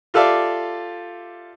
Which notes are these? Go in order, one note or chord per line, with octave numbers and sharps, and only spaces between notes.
F4 G4 A4 D5 E5 F5